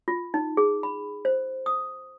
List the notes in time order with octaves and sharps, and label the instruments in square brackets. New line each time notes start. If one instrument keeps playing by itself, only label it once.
[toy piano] F4
D#4
G#4
B5
C5
D#6